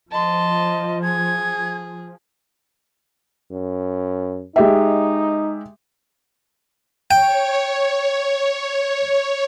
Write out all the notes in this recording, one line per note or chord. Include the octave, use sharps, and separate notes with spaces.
F3 D#5 A5 C6
G#4 G#6
F#2
G#3 D#4 G4 E5
C#5 G5